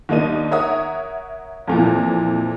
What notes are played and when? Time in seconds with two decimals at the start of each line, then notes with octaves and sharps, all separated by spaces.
0.09 D#2 A#3 D4 D#4 D#7
0.51 A#4 C#5 E5 F#5 D#6
1.68 F2 A#2 E3